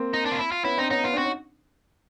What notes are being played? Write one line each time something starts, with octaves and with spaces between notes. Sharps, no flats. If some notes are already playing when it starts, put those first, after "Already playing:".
Already playing: A#3 C4
D#4
D4
F4
E4
F4
B3 C#4 E4
C4 D4 D#4
B3 C#4 D#4
B3 C#4 F4
C4 D4
F#4
C#4 D#4